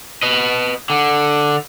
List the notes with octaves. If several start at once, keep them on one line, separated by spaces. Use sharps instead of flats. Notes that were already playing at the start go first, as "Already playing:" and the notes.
B4 D#5
D3